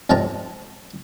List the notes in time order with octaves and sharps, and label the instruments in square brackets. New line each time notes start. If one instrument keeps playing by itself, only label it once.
[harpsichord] F2 G#2 C3 G5 A5 A#5